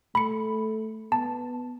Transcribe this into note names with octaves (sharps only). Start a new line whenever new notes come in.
A3 B5 C#7
B3 A5